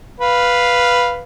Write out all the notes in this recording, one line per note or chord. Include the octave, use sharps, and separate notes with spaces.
B4 F5